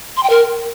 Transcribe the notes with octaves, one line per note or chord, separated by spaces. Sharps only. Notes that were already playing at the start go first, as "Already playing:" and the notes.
C6
G5
A#4